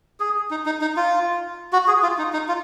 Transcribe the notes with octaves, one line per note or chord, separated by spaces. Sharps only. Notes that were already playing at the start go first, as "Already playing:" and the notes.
G#4
D#4
D#4
D#4
F4
F#4
G#4
F4
D#4
D#4
F4